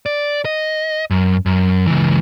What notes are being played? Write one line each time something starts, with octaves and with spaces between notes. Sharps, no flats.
D5
D#5
F#2
F#2
C#2 E3